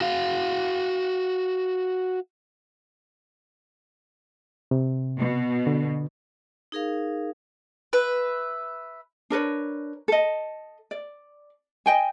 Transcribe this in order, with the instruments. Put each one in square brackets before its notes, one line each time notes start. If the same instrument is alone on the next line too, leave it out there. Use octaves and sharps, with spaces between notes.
[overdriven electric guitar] F#4 F5
[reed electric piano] C3
[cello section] B2
[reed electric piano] D3
[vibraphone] D#4 G#4 A#4 F5
[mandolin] B4 E5
[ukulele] D4 A#4 B4 C#5
A4 D#5
D5
D#5 G5 G#5